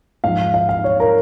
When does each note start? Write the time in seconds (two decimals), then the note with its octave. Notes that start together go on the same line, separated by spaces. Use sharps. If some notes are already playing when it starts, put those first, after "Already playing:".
0.24 G#2 F3 F5
0.54 F5
0.69 F5
0.84 C#5
1.00 A#4